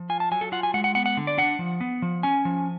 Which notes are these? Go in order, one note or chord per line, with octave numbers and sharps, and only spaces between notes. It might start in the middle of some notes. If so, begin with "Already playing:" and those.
Already playing: F3
F4 G#5
A5
F#3 G#5
A4
F4 F#5
G#5
G#3 F#5
F#5
B3 F#5
F#5
D3
D5
D4 F#5
F3
B3
F3
C#4 G#5
F3